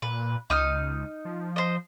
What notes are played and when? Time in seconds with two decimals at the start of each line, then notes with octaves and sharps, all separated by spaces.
0.02 A#2 B4
0.50 C#2 D#4 D#6 F6
1.25 F3
1.56 C5 D#5